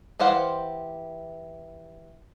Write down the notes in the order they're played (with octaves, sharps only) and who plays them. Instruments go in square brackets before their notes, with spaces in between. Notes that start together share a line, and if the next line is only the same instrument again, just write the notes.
[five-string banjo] E3 G4 C5 F5 F#5